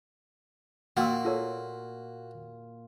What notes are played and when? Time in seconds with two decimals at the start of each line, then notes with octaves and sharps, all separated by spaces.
0.97 A#2 F#4 F5 G5 E6
1.25 F4 A4 C#5